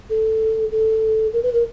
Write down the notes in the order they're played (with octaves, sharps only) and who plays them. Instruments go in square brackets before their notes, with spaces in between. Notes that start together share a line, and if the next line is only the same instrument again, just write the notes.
[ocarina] A4
A4
A#4
B4
A#4